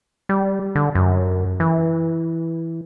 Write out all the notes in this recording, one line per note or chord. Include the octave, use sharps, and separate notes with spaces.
G3
D3
F#2
E3